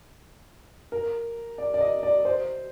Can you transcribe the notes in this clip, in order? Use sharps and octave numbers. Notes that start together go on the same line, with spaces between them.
A#4
D5
D5
D#5
D5
C5